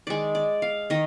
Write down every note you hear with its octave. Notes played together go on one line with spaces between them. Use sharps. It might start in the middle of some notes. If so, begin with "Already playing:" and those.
D#3 G#3 D5
D5
F5
D#3 D#5